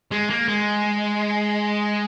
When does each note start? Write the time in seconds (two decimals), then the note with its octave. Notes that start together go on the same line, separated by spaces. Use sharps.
0.11 G#3
0.30 A#3
0.48 G#3